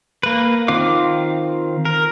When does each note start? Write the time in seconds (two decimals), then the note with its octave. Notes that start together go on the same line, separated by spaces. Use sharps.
0.23 A#3 B4
0.68 D#3 C4 F4 F5 D6
1.85 A#4